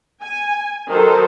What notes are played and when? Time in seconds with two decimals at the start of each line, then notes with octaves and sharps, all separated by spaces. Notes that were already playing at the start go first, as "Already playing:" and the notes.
0.22 G#5
0.90 D#3 F#3 A4 C5